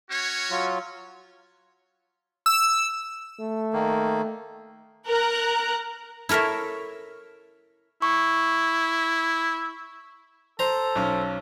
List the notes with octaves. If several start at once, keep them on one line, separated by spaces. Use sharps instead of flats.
C#4 F#4 C#5
F#3 F4
E6
A3
D#3 A#3
A#4 A#5 F#6
E4 A4 A#4 C#5 E5
E4 C#6
A4 C5 A#5
B1 C#4